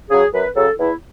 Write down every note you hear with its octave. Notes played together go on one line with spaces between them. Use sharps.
C#3 F#3 G#4
F#2 B4
C#3 F#3 A4
E2 E4